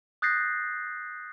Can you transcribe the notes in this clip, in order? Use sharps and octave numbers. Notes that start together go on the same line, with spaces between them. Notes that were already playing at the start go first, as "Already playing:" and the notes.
D#6 F#6 G6 A6 A#6 C7